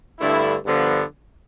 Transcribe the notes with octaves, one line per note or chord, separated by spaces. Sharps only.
G2 D3 A3 E4
G2 D3 F3 B3